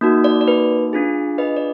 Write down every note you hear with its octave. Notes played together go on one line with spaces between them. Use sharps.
A#3 D#4 F#4
D5
D5
B4
D4 F4 G#4
B4 D#5
D5